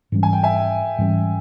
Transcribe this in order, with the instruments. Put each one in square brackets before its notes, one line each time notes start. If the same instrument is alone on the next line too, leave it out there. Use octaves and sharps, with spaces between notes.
[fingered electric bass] G#2 E3 G3 C#4
[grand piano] G#5
G5
E5 G#5
[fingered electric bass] G#2 E3 G3 C#4